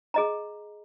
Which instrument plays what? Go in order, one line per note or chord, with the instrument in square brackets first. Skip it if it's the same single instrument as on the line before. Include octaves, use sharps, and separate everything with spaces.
[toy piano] G#4 D#5 A#5